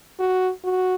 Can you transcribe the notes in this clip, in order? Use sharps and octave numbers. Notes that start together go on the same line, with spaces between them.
F#4
F#4